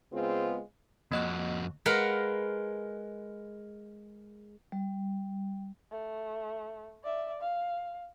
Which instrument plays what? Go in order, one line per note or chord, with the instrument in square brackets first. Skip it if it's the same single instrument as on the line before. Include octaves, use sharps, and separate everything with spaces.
[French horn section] C#3 G#3 B3 C4 F4 G#4
[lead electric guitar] F2 F#4 [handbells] A#3 D#5 F#6
[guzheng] G#3 A#4 B4 F5 F#5 A#5
[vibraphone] G3
[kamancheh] A3
D5 E5
F5